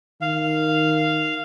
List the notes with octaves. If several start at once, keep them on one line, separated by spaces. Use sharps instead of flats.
D#3 F5